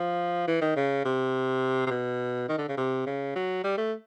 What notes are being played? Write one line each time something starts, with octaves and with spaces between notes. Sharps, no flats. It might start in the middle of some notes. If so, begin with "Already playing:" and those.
Already playing: F3
E3
D#3
C#3
C3
C3
B2
D#3
D3
C#3
C3
C#3
F#3
G3
A3